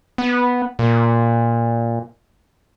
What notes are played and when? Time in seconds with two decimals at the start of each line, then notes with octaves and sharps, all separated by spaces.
0.18 B3
0.79 A#2